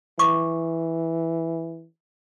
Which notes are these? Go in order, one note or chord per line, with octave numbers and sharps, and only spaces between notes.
E3 C#6 D6